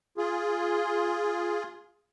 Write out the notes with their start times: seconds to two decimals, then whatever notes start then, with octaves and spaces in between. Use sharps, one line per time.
0.17 F4 G#4